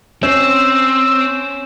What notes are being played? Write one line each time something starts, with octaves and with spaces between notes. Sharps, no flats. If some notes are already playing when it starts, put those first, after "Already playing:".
C4 C#4 E6 G6 E7